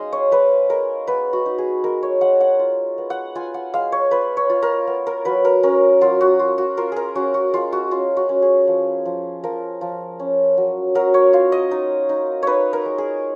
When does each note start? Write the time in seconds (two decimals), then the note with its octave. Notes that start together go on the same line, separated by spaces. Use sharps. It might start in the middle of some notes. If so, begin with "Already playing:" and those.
Already playing: G#3 D#4 D#5 F5
0.12 C#5
0.32 G#3 B4
0.70 G#3 A#4
1.07 B3 B4
1.33 F#4
1.46 D#4
1.58 G#4
1.84 G#3 A#4
2.03 C#5
2.21 G#3 F#5
2.41 F#5
2.59 F4
2.98 B3
3.10 F#5
3.35 F4 G#5
3.54 F#5
3.74 G#3 F5
3.92 C#5
4.11 F4 B4
4.37 C#5
4.50 F4
4.63 A#4
4.87 B3
5.07 A#4
5.25 F#3 B4
5.45 A#4
5.63 C#4 A#4
6.01 F#3 F4
6.21 F#4
6.39 F4
6.58 F#4
6.77 F4 A#4
6.92 G#4 A#4
7.15 C#4 F#4
7.34 F#4
7.54 G#3 F4
7.72 F#4
7.91 C#4 F4
8.17 F#4
8.29 C#4
8.42 G#4
8.67 F3
9.05 F3
9.44 F3 A#4
9.81 F3
10.20 C#4
10.57 F#3
10.95 F#3 A#4
11.14 C#5
11.33 F4 F5
11.52 D#5
11.71 D#4
12.09 D#4
12.43 D#4 B4 C#5
12.73 A#4
12.85 G#3
12.98 G#4